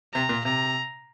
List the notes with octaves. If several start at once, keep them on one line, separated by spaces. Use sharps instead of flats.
C3 A#5
A#2
C3 A#5